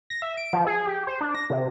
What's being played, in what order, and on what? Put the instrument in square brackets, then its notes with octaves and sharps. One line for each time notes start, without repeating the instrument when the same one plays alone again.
[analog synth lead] A#6
E5
D7
F3
G#4
G4
C5
D4
A#6
C3